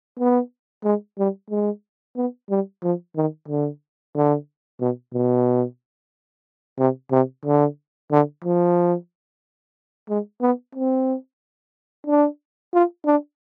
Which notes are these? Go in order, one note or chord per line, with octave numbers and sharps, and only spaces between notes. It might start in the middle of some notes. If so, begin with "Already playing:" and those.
B3
G#3
G3
G#3
B3
G3
F3
D#3
D3
D3
B2
B2
C3
C3
D3
D3
F3
G#3
B3
C4
D4
F4
D4